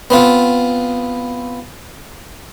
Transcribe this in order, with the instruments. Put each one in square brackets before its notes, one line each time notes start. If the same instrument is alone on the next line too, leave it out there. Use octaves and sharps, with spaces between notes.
[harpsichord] B3 C4 F4